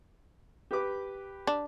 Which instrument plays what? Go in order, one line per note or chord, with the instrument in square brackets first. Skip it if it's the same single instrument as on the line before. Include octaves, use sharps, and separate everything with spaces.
[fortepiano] G4 B4 D6
[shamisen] D4